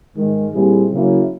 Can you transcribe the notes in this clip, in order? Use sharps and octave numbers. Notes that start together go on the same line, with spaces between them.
G#2 D#3 G#3
A#2 G3 C4 E4 G#4
C#3 F#3 A#3 C#4 E4